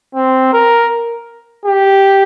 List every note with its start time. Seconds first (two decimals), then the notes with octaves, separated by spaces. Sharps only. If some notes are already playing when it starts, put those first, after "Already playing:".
0.15 C4
0.53 A#4
1.65 G4